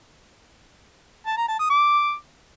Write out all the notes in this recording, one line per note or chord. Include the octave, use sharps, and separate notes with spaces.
A5
A#5
A5
D#6
D6